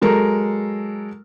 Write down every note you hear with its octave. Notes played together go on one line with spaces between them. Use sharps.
F#3 G#3 A4 A#4